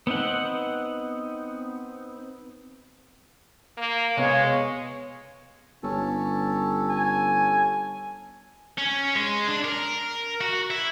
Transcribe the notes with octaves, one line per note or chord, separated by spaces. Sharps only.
B3 C4 D#4 F#5
A#3
C3 G#3 B3 C#5 F5
G1 C#4 A4
G#5
C#4
G#3
D4
A#4
F#4
E4